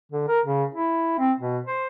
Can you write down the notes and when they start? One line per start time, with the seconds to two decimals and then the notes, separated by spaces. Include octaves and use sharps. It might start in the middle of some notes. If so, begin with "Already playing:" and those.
0.12 D3
0.28 A#4
0.45 C#3
0.75 E4
1.19 C4
1.40 B2
1.65 C5